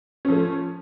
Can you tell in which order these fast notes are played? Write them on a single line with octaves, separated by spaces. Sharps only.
C#4 F3 A3